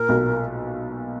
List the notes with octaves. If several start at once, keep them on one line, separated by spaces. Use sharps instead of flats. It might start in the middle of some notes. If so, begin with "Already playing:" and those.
Already playing: A#2 A#4
B1 B2